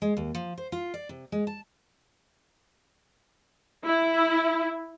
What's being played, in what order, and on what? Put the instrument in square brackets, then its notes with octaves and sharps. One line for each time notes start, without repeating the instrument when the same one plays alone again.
[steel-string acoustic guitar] G#3
D#2
F3
C5
F4
D5
C3
G#3
A5
[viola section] E4